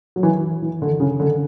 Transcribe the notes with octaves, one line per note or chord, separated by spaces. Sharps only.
F#3
E3
E3
D3
C#3
D3